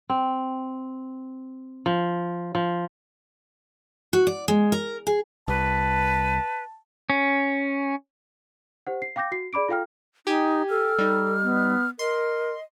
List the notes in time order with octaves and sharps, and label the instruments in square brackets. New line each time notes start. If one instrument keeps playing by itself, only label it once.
[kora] C4
F3
F3
[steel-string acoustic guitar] F#4
D5
G#3
A#4
G#4
[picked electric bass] C2 [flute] B4 [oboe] A5
[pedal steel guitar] C#4
[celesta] G4 C5 F#5
C7
F5 G5 D6 G6 A#6
F#4 C7
G#4 D5 B5 D6 D7
F4 A4 F5 G5 F6
[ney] D#4 [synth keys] G4 G#5
[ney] A4 [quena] F6
[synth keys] G3 D#4
[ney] B3
[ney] A#4 [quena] D#5 [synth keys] C6